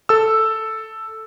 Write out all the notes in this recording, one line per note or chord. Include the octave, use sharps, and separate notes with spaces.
A4 E6